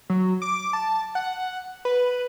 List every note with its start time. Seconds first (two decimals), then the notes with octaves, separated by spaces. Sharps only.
0.10 F#3
0.42 D6
0.73 A5
1.15 F#5
1.85 B4